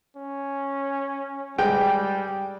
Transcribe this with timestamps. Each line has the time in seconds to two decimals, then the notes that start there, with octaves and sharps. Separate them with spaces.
0.17 C#4
1.58 G3 G#3 G5